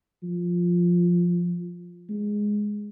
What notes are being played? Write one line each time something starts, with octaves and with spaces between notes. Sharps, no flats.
F3
G#3